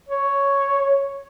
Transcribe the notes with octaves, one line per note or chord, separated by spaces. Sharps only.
C#5